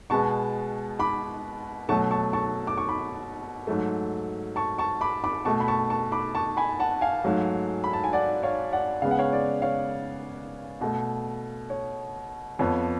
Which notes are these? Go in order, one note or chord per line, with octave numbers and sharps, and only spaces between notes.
B2 G#3 B3 A5 C#6
B5 D6
B2 F#3 A3 A5 C#6
A5 C#6
A5 C#6
D6
C#6
B5 D6
G#2 F#3 A3
A5 C#6
A5 C#6
B5 D6
B5 D6
B2 A3 A5 C#6
B5
A5 C#6
A5 C#6
B5 D6
A5 C#6
G#5 B5
F#5 A5
F5 G#5
G#2 F#3 A3
B5
A5
G#5
D5 F#5
C#5 F5
D5 F#5
C#3 G#3 B3 F5
F#5
C#5 F5
D5
C#5 F5
B2 A3
C#5
F2 F3 B3 C#5